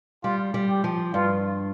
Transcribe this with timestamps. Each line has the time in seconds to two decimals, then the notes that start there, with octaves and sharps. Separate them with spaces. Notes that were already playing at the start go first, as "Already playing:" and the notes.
0.24 G3 F4
0.54 G3
0.69 G4
0.84 F3
1.14 G2 F4